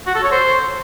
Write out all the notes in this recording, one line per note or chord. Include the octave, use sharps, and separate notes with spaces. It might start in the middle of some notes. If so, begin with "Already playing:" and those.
F#4
A4
C#5
C5